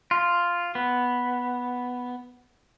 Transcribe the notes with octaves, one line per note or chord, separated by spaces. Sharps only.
F4
B3